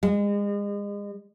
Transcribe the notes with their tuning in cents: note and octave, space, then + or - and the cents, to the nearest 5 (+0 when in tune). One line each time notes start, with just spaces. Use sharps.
G#3 -35